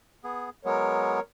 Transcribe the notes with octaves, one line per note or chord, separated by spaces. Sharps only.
B3 G#4
F#3 G#3 B3 A#4 C#5